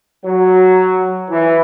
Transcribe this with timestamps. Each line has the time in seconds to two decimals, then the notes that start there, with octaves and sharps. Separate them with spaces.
0.25 F#3
1.30 E3